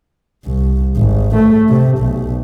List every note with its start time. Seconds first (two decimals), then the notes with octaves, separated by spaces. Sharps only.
0.45 C2
0.96 G#1
1.36 A3
1.69 C3
1.98 B1